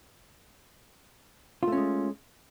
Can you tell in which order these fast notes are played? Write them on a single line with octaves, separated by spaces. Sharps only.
F4 A3 C#4 G#3